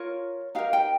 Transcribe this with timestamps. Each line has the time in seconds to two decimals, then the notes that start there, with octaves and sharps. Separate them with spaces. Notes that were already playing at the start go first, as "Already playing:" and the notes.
Already playing: F4 A#4 C#5
0.55 D#4 G4 A#4 F5
0.73 G5